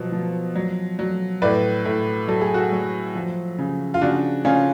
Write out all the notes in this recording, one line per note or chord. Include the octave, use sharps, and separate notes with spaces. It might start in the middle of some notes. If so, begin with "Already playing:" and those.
Already playing: B2 F3 F#3
F3
F#3
F#3
A2 B4 D5
A2
F#3 A4
G#4
F#4 A4
F#3
F3
C#3
F4
C#3 D4 F#4
C#3 C#4 F4